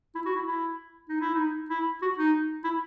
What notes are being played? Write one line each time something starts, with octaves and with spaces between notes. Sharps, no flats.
E4
F#4
E4
E4
D#4
E4
D#4
E4
F#4
D#4
E4